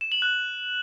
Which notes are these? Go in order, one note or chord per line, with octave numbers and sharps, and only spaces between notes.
E7
F#7
F#6